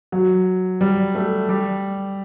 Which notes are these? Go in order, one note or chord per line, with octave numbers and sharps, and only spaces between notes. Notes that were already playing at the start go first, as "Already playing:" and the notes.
F#3
G3
A3
G3